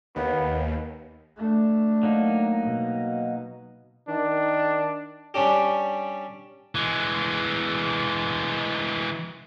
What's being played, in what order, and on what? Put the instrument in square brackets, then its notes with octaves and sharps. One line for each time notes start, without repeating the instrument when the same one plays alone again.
[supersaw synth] D#2 [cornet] B3
[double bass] A3 D4
[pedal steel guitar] F#3 A#3 D#4
[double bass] B2
[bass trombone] D#3 [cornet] D4
[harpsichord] G3 C#4 D4 G4
[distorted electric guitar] E3 G#3